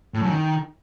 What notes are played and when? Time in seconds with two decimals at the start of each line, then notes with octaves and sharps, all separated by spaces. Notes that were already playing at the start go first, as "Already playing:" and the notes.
0.14 A2
0.22 F#2
0.29 D#3